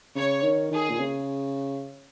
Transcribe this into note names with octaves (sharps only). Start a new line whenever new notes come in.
C#3 C#5
D#3
D#3 G#4
A#2
C#3